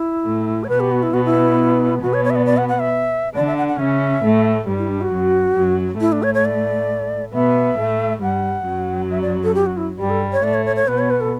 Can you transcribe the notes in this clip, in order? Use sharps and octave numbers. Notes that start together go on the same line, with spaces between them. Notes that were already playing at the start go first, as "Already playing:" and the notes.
Already playing: E4
A2 A3
C#5
B2 B3 B4
G4
F#4
E4
B2 B3 F#4
E4
B2 B3 F#4
C#5
C#5
E5
D5
D5
F#5
F#5
E5
D3 D4 D5
E5
F#5
F#5
C#3 C#4 E5
A2 A3
G2 G3
E4
D4
F#4
F#2 F#3
F#2 F#3
A2 A3 E4
D4
C#5
C#5
D5
B2 B3 E5
A2 A3
G2 G3 F#5
F#2 F#3
E5
D5
A4
G4
F#4
E4
G2 G3 G4
A4
C#5
A2 A3 D5
C#5
C#5
C#5
B2 B3 B4
C#5
B4
A4